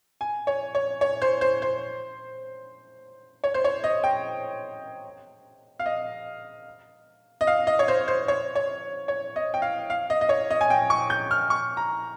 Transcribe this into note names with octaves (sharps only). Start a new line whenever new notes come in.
G#5
C#5
C#5
C#5
C5
C5
C5
C#5
C5
C#5
D#5
G5
F5
D#5
D#5
F5
D#5
C#5
C5
C5
C#5
C#5
C#5
D#5
G5
F5
F5
D#5
D#5
C#5
D#5
G#5
G5
C#6
G6
F6
C#6
A#5